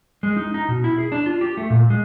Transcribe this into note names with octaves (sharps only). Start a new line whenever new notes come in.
G#3
D#4
D#4
B2
E4
G#4
D4
F4
G4
A3
A#2
G#3